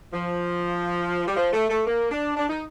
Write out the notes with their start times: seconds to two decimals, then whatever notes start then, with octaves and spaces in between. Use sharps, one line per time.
0.13 F3
1.27 G3
1.36 F3
1.53 A3
1.70 A3
1.87 A#3
2.11 D4
2.36 D4
2.49 D#4